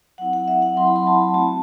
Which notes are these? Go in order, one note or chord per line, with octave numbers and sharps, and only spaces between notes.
F#3 C4 E4 F#5
F#5
E5
F#5
F#3 C4 E4 C6
B5
C6
A5
B5
A3 C4 F#4 A5